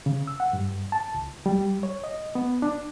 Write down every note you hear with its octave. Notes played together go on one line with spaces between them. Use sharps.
C#3
E6
F#5
G2
A5
C#2
G3
C#5
D#5
B3
D4